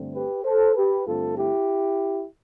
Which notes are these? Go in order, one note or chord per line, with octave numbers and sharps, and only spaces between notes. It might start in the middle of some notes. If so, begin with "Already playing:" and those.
Already playing: G2 D3 A3 C4
G4 B4
A4 C5
G4 B4
G2 D3 A3 C4 F4 A4
E4 G4